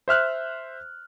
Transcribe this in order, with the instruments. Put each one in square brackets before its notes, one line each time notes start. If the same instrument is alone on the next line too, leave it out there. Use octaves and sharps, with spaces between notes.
[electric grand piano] C5 E5 F6 F#6